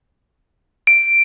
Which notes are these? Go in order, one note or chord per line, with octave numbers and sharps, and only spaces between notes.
D7